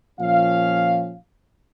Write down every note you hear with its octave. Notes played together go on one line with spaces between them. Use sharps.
A#2 F3 C#4 F5